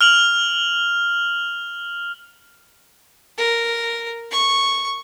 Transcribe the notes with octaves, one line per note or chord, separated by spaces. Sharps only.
F6 F7 F#7
A#4
C#6